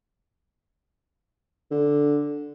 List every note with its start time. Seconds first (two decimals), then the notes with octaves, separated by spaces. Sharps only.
1.71 D3